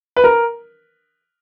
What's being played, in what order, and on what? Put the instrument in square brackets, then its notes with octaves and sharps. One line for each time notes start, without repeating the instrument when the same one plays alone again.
[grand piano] B4
A#4